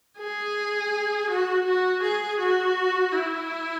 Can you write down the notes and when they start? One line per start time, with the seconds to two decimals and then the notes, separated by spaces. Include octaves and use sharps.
0.18 G#4
1.29 F#4
1.65 F#4
2.02 G#4
2.39 F#4
3.12 E4